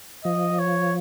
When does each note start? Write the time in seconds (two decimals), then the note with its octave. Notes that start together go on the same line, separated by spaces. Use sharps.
0.24 F3 D#5
0.59 C#5